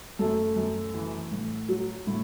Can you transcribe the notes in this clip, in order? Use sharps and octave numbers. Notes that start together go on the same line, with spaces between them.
F#2 A3 A4
F#2
E3
A2
F#3
A2